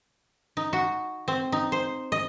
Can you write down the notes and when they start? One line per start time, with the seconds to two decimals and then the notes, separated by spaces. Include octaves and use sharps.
0.57 D#4
0.73 F#4
1.28 C4
1.52 D#4
1.72 C5
2.12 D#5